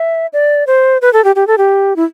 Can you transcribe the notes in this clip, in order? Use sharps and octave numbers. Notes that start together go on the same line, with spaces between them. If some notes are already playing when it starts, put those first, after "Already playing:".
Already playing: E5
D5
C5
B4
A4
G4
G4
A4
G4
E4